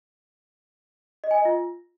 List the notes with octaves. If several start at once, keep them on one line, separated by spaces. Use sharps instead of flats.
D#5
G#5
D#5
F4